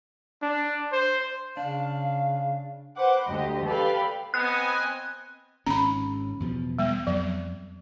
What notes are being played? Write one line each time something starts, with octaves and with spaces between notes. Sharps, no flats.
D4
C5
C#3 D4 F5
B4 C5 F#5 D6
D2 G4 D#5
G4 A4 B4 D5 F5 B5
B3 C4 D#5 G#5 F#6
G#1 G#2 C#4 A#5 B5
E2 B2 F3
G3 B3
F2 F#3